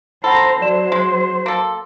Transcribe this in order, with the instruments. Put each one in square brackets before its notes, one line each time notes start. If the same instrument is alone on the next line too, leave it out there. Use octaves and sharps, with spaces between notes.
[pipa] A4 [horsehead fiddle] C5 A#5 [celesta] F#5 B5
[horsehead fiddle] F#3 C5 [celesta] D5 E7
[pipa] G#3 [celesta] C6
[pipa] A#3 A4